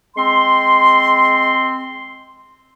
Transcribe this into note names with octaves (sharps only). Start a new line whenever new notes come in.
G#3 C4 C6